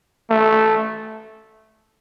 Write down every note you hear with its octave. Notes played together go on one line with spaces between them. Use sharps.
A3